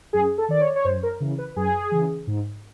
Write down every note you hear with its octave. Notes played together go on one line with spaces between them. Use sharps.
F#2 G#4
A4
D#3 D5
C#5
C#5
F#2 C5
A#4
C#3 E3
B4
F#2 G#4
C#3 E3
G#2